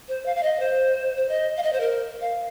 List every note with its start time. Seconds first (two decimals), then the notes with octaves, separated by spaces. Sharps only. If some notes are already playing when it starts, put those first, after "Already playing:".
0.08 C5
0.26 F5
0.36 F5
0.43 D#5
0.60 C5
1.17 C5
1.29 D#5
1.57 F5
1.63 D#5
1.73 C5
1.80 A#4
2.21 F5